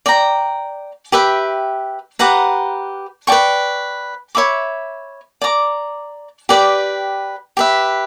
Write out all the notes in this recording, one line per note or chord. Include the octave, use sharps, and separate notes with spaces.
D5 G5 A#5
G4 B4 E5 G5
G4 B4 F#5 A#5
B4 D5 G5 C#6
C#5 E5 B5 D6
D5 A#5 D6
G4 B4 D5 G5
G4 B4 E5